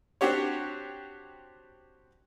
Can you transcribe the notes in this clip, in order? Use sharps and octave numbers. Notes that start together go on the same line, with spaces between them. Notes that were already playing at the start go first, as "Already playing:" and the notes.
C4 D4 F#4 G4 C#5